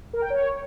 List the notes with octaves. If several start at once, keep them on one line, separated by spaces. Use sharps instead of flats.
A#4
G5
C#5